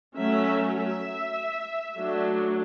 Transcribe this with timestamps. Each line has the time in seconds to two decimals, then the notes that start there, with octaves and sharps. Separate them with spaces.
0.17 F#3 A3 C#4 E5
0.63 E5
1.98 F#3 A3 D4